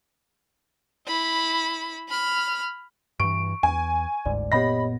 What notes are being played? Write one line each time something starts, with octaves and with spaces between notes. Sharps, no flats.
E4 B5
B5 F6
G2 E3 C#6 D7
E2 G#5
G1 D2 G#2 D5
F#1 A#2 B3 G4 C#5 D#5 B5 A#6